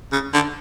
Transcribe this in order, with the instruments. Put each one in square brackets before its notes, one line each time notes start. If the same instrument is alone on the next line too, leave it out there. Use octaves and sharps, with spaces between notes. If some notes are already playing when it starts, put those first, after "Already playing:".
[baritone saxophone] C#3
D3